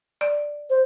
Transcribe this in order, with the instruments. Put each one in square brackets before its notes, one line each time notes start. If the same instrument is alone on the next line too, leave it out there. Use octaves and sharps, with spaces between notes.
[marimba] D5
[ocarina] C5